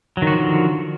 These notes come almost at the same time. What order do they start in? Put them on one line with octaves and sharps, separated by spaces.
F#3 D#3 F#4 F3 D3